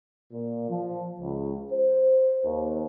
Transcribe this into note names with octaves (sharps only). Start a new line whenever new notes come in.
A#2
F3
C#2
C5
D#2